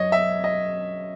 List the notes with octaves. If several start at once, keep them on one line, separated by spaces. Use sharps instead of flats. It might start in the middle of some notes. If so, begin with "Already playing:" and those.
Already playing: F#2 C#5 D#5
E5
D#5